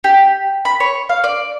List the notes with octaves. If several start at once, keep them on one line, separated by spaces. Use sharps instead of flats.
G4
B5
C#5
F5
D5